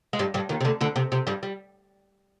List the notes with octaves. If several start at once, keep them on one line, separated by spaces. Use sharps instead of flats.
G#3
G2 G3
G2 G3
D#2 D#3
C3
D2 D3
D2 D3
C3
C3
G2 G3
G3